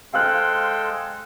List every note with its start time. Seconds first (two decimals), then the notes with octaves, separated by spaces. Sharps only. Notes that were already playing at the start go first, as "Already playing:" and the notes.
0.13 G#3 A4 C5 F5 G5 C6 F6 F#6